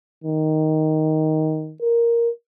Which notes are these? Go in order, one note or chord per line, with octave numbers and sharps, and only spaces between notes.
D#3
A#4